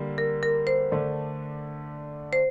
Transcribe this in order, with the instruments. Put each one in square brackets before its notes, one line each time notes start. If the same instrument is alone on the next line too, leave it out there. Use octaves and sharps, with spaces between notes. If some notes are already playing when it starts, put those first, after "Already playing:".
Already playing: [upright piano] D3 G3 A#3
[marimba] A#4
A#4
C5
[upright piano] D3 A3 D4
[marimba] C5